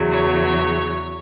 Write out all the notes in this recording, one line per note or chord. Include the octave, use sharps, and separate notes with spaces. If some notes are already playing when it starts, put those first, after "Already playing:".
Already playing: E2 C#3 F#3
C#5